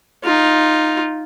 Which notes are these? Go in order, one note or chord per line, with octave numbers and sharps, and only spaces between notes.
D#4 F4